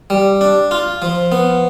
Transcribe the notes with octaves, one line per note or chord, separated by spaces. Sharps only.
G3
D4
F4
F3
B3